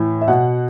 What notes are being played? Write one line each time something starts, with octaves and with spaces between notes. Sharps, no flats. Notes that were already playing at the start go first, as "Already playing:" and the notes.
Already playing: A2 E3
E5
B2 F#5